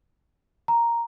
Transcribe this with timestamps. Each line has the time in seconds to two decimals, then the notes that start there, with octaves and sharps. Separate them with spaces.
0.68 A#5